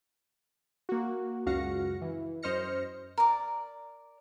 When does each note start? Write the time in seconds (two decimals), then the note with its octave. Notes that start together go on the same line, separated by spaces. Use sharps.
0.89 A#3 F#4
1.46 C#2 F#2 F#4 F5 A#6 C#7
2.02 E3
2.43 F#2 C5 D#5 F6 A#6 C#7
3.18 A#4 D5